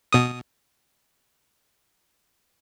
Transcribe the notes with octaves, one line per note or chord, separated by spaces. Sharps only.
B2 D#6